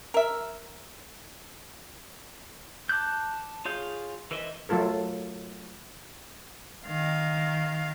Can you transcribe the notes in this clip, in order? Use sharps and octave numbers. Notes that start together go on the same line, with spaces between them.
A#4 E5
A5 D6 F#6 G6
F4 G#4 C#5 F5 G6
E3 A#4 C5 D#5 E5
F#3 A3 F4 A4 A#4
D#3 F5